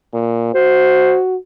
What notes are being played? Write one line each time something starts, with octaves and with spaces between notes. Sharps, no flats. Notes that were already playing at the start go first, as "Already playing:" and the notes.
A#2
F#4 C5